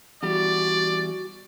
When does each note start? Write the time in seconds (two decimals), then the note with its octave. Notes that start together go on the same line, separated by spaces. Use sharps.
0.23 E2 G3 F#4 D5